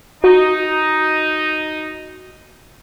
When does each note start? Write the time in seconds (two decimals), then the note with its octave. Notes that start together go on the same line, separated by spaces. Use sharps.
0.24 D#4 F#4